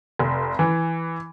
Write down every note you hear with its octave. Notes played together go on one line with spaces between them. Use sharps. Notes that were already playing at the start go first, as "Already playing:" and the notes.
F1
E3